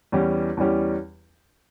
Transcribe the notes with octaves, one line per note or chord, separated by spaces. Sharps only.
E2 E3 G3 C#4 G4
E2 E3 G3 C#4 G4